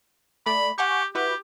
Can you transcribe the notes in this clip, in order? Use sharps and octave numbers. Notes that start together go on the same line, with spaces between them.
A3 D5 B5
G4 F#5 G#5 C#6
E4 F#4 G4 B4